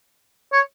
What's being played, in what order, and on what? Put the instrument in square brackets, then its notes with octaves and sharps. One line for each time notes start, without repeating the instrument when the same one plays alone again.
[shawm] C#5